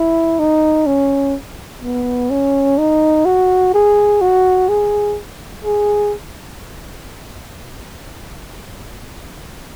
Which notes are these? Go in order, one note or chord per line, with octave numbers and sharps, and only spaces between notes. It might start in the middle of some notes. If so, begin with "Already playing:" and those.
Already playing: E4
D#4
C#4
B3
C#4
D#4
F#4
G#4
F#4
G#4
G#4